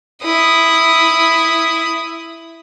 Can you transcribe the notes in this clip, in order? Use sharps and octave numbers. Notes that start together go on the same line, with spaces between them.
E4 D#6